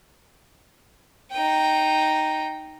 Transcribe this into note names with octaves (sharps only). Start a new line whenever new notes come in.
D#4 G5